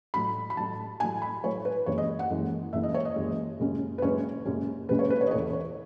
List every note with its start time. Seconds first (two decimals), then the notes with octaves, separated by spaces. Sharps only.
0.14 A1 A2 F#3 B5
0.50 B5
0.57 A1 A2 F#3 A5
1.00 A1 A2 F#3 G#5
1.22 B5
1.44 A1 A2 F#3 C#5
1.65 B4
1.86 F#1 F#2 E3 G#3 C#5
1.98 D#5
2.19 F#5
2.30 F#1 F#2 E3 G#3
2.73 F#1 F#2 E3 G#3 E5
2.83 D#5
2.94 C#5
3.05 D#5
3.16 F#1 F#2 E3 G#3
3.59 F#1 F#2 C#3 G#3 C#4
3.98 B4
4.02 F#1 F#2 C#3 G#3 C#4 C#5
4.45 F#1 F#2 C#3 G#3 C#4
4.88 F#1 F#2 C#3 G#3 C#4 B4
4.99 C#5
5.10 B4
5.21 C#5
5.27 D#5
5.31 E2 C#3 E3 A3 E4 C#5
5.53 C#5